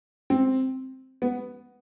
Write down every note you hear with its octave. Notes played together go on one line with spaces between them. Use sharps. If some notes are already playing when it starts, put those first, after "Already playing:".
C4
B3